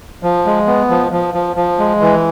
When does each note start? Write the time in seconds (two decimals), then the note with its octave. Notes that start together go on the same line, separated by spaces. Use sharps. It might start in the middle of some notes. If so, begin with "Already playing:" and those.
0.23 F3
0.46 G#3
0.67 B3
0.90 F3
1.12 F3
1.34 F3
1.56 F3
1.79 G#3
2.01 E3